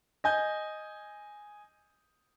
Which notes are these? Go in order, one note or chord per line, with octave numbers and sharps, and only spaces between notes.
D#5 G#5 G6